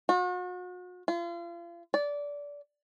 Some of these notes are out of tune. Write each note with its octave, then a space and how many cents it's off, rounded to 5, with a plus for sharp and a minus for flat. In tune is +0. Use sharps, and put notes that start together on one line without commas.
F#4 -40
F4 -35
D5 -20